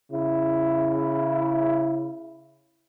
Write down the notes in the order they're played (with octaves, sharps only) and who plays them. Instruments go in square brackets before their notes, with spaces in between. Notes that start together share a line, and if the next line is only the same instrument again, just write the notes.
[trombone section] C#3 E4